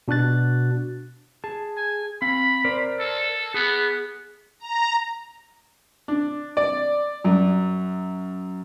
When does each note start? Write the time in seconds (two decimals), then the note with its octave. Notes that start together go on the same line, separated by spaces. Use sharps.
0.08 B2 D4 F#4 F#6 A6
1.44 G#4 A5
1.77 G#5
2.22 C4 F5 B5
2.65 A#4 C5 D5
2.99 A4
3.54 B3 G#4
4.59 A#5
6.08 D4
6.57 D5
7.24 F#2